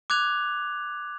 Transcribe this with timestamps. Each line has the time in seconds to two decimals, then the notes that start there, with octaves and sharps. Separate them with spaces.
0.10 D6 F#6 G#6 F7